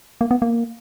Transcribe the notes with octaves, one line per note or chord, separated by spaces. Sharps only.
A#3
B3
A#3